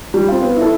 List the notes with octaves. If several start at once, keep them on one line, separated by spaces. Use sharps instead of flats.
G3
C4 F4
B3
E4 A4